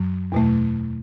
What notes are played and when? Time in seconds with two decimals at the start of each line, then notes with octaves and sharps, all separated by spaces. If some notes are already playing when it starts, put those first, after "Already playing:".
Already playing: F#2 F#3
0.32 E2 B2 A3